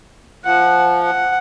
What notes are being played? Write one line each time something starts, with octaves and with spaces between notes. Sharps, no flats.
F3 F#5
F#5